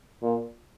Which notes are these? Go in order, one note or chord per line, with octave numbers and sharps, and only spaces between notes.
A#2